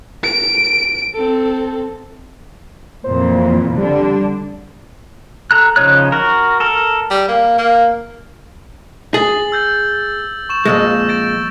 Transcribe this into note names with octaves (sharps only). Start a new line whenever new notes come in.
D7
C4 A4
F2 A#2 E3 C5
D3 G3 D4
A4 A#5 F#6
C#3 F3 D#4 C#5 F#6
F#4 A#4
A4 A#4
G3
A#3
A#3
G#4 A6 F#7
E6 G6 A6
C#6 E7
F2 A#2 G#3 E6 A6 A#6
G6 A6 D7